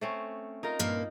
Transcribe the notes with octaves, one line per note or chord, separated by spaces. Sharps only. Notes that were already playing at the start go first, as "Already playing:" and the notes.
A3 C4 C#4
D#4 F4 A#4
G2 A#2 A#3